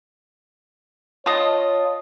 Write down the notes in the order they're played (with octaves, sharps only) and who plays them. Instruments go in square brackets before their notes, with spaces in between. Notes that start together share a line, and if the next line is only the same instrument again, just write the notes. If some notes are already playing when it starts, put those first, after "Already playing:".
[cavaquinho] F4 D#5 [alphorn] C#5 [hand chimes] A5